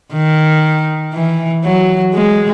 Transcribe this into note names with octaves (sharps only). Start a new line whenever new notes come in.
D#3
E3
F#3
G#3